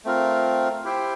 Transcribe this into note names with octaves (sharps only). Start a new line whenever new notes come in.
A3 C4 F4 A#4
E4 G4 C5 E5 G5